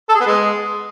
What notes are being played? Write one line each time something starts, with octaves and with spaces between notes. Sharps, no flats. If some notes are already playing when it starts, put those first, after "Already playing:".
A4
G#4
B3
G#3